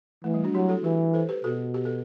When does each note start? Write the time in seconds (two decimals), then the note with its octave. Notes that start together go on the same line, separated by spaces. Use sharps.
0.24 E3 A3
0.34 G3
0.44 D4 F#4
0.54 F#3 E4 G4
0.69 F#4 A4
0.84 E3 G4 B4
1.14 A4 C5
1.29 G4 B4
1.44 B2 F#4 A4
1.74 G4
1.85 A4